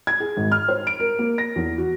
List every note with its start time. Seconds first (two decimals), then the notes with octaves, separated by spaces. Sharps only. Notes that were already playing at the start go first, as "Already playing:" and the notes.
0.07 G#6
0.20 G#4
0.37 G#1
0.52 F6
0.68 C5
0.87 D7
1.00 A#4
1.19 A#3
1.38 A#6
1.56 E2
1.78 F#4